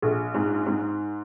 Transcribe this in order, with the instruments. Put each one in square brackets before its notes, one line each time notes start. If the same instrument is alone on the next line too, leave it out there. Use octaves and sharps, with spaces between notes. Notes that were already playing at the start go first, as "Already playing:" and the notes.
[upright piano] A#1
G#2
G#2